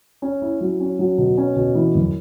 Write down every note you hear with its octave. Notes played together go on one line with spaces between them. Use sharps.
C#4
E4
F#3
C#4
F#3
B2
C#4
B2
E3
F#2